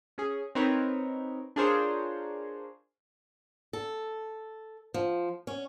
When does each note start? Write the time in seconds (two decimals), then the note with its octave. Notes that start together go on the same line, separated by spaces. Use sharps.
0.18 C#4 G#4
0.55 C4 D#4 A#4 B4 C#5
1.56 D4 F4 G#4 A#4 C5 C#5
3.73 A4
4.94 F3
5.47 C#4